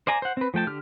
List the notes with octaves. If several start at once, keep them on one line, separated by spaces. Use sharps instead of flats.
C5 D5 G#5 A#5
C5 F#5
C4 B4
F3 A3 G5 A5
D3 G4 F6